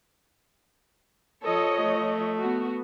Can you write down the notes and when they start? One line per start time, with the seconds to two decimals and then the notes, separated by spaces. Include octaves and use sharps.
1.44 F3 A4 C#5 D#5
1.82 A3
2.38 B3 F#4